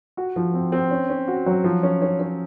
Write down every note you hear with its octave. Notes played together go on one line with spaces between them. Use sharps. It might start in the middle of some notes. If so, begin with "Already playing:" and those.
F#4
F3
C4
C4
C#4
C#4
F#4
F#3
F3
C#4
C#4
C#4